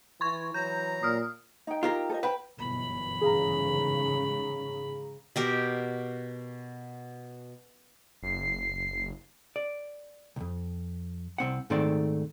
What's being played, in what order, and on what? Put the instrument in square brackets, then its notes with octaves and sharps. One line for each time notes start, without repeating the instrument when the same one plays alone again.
[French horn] E3 [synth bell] C6 C#6 G#6
[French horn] E3 [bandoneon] F#3 A#5 [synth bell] G6
[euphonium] A#2 [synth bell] D#6 F6
[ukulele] D#4 G5
[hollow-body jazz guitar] F4 G4 A#4
[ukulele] A4 C5 D#5
[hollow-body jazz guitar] B4 [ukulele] C5 G5 B5
[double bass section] G1 F#2 E3 [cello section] B2 [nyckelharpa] B5
[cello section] G#2 C#3 [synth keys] G#4 F5 A#5
[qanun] B2 G4 A#4
[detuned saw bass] F#1 [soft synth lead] C7
[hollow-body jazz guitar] D5
C2 F2
C2 C4 F#5
G#2 D#3 A3 C4 D5